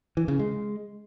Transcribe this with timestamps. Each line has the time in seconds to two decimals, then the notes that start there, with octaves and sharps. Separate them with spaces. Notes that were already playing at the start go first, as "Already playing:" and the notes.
0.17 E3
0.28 C#3
0.39 G#3